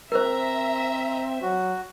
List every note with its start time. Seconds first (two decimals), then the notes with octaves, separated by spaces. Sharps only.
0.12 C4 A#4 C5 E5 A#5
1.42 F#3 F#4